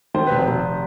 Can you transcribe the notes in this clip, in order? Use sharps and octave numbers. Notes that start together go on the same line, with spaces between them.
D#3 C5
F1 B4
C5
F1